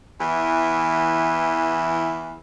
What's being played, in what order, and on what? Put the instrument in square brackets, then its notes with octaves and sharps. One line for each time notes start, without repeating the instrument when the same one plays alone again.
[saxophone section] E2 E3